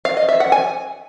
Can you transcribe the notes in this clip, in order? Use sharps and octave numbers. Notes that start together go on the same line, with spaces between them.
F5
D#5
E5
F#5
G#5